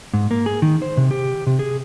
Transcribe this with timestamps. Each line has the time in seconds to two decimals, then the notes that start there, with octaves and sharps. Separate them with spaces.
0.14 G#2
0.31 A#3
0.46 G#4
0.62 D#3
0.82 C5
0.97 C3
1.11 G4
1.47 C3
1.59 G#4